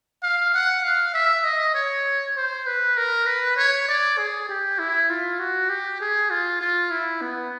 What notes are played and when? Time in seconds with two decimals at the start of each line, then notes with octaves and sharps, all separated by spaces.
0.23 F5
0.54 F#5
0.84 F5
1.14 E5
1.44 D#5
1.75 C#5
2.37 C5
2.67 B4
2.97 A#4
3.27 B4
3.57 C#5
3.88 D5
4.18 G#4
4.49 G4
4.79 E4
5.10 F4
5.39 F#4
5.69 G4
6.00 G#4
6.30 F4
6.61 F4
6.91 E4
7.21 B3